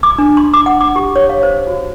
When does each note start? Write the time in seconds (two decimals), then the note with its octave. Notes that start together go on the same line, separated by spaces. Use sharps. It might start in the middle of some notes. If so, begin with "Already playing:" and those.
0.03 D6
0.18 D4
0.37 C6
0.54 D6
0.66 F#5
0.81 D6
0.96 G4
1.16 C#5
1.29 F5
1.43 C5
1.67 F#4